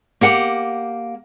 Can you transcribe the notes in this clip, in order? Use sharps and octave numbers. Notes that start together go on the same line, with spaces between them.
A#3 G4 F#5